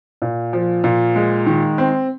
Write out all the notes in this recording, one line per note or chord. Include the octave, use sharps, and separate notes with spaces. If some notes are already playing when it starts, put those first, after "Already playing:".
A#2
F3
A#2
G#3
D#3
C4